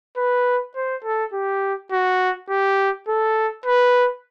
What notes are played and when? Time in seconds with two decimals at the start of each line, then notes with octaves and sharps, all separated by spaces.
0.17 B4
0.76 C5
1.04 A4
1.33 G4
1.92 F#4
2.50 G4
3.08 A4
3.66 B4